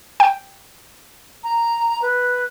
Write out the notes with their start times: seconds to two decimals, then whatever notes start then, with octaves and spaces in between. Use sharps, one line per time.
0.20 G5
1.43 A#5
2.02 B4